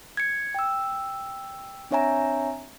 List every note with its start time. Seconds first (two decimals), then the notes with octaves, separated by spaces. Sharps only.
0.17 G#6 C#7
0.55 G5 E6
1.91 C4 D4 C#5 E5 G#5 A#5